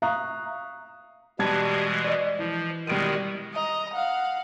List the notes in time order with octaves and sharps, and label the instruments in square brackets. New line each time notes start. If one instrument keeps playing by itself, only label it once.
[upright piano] E5 F5 A#5 C#6 D#6 F#6
[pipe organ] B2 E3 G#3 [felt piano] G3 A5 G#6
[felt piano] D5 D#5
[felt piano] E3 [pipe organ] F3
[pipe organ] B2 D#3 G#3 [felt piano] G3 D7 D#7
[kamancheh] D#5 A#5
F5 F#5